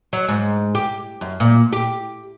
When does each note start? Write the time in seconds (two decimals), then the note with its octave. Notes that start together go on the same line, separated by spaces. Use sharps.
0.13 F#3
0.28 G#2
0.75 G4
1.21 F#2
1.40 A#2
1.73 G4